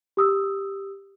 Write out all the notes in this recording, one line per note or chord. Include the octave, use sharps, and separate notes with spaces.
G4 D#6 E6